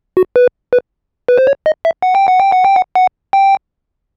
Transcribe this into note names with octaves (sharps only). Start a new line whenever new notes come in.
F#4
B4
B4
B4
C5
C#5
D#5
E5
F#5
G5
F#5
G5
F#5
G5
F#5
F#5
G5